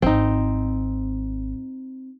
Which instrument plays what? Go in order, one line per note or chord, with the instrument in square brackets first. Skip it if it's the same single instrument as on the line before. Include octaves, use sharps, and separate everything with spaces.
[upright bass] G#1 [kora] C4 D#4